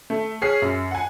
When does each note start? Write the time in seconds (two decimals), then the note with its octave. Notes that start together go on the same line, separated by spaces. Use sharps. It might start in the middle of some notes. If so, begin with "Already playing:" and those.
0.10 A3
0.42 G#4 C#5 F6 B6 C7
0.62 F#2
0.91 F#5 G#5